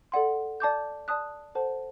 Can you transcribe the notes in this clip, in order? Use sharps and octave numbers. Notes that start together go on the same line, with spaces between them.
A4 D5 F#5 C6
D5 A5 D6 G6
D5 A5 D#6 F#6
A4 C5 F#5 A5